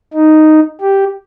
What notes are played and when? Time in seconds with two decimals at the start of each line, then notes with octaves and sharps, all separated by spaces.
0.14 D#4
0.81 G4